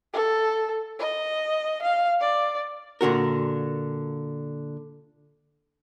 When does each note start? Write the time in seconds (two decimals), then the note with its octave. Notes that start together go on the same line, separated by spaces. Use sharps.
0.13 A4
0.99 D#5
1.82 F5
2.20 D5
3.01 A#2 D3 F#4 A#4